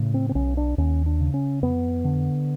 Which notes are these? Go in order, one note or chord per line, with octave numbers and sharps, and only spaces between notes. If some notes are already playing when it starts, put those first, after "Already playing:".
Already playing: A2 C#3
C4
C4
B1 C#4
D4
D#2 C#4
D4
C#3
C#4
F2 B3
D3